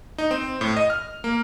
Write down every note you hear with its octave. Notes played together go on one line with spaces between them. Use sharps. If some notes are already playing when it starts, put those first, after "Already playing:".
D#4
C4
A2
D#5
F6
A#3